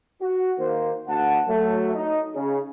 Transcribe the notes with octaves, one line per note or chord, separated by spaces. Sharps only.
F#4
D#3 A#3 C5
D2 F#5 A5
F#3 A3
D#4
C#3